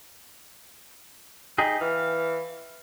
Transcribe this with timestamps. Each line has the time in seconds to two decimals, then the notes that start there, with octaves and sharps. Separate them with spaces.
1.58 D#4 G4 G#4
1.81 E3 F5